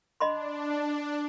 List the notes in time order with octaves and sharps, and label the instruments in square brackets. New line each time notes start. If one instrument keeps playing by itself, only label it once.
[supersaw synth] D4 [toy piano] D#5 B5 C6